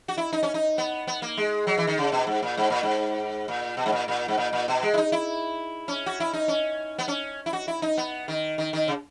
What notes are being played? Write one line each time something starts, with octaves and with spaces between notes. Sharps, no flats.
F#4
E4
D#4
C#4
D#4
B3
B3
A#3
G#3
F#3
E3
D#3
C#3
B2
G#2
A#2
G#2
A#2
G#2
A#2
B2
G#2
A#2
A#2
G#2
A#2
A#2
B2
G#3
E4
D#4
E4
C#4
F#4
E4
D#4
C#4
B3
C#4
E4
F#4
E4
D#4
B3
D#3
D#3
D#3
C#3